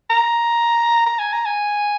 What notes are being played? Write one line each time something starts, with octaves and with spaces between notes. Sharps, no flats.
A#5
A#5
G#5
A#5
G#5